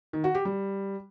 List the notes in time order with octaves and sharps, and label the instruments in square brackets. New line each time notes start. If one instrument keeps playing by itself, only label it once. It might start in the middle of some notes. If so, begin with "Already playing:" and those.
[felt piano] D#3
F#4
G4
G3